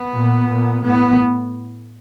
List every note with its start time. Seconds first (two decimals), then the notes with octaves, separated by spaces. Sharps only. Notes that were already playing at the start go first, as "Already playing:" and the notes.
Already playing: B3
0.13 A#2
0.48 A#2
0.83 A2 B3